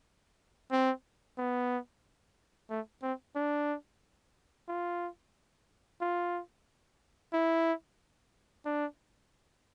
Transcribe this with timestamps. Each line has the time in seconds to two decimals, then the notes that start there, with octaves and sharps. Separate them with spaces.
0.71 C4
1.38 B3
2.70 A3
3.02 C4
3.36 D4
4.68 F4
6.01 F4
7.33 E4
8.66 D4